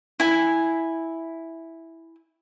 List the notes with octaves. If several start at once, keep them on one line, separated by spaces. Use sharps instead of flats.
E4 G#5